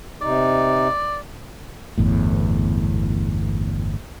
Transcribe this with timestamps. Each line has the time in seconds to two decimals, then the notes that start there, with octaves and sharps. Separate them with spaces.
0.21 C3 D#4 D5
1.98 G1 E2 A2